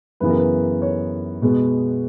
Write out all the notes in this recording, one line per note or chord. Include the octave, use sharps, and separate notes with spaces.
F#2 C#3 E3 B3 B4
A#4
B4
C#5
B2 G#3 B3